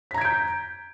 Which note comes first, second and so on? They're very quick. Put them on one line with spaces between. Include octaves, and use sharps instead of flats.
B6 A#5 G#6 D7 G6